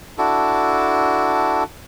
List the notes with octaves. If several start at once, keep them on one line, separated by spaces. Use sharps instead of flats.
D4 E4 F#4 A4